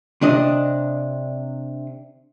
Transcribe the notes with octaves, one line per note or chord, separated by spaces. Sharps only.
C3 D4 D#5